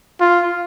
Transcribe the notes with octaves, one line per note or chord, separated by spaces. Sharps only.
F4